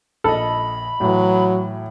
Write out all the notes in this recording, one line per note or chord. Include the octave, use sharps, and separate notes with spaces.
A#1 A4 D#5 B5
A2 E3 F#3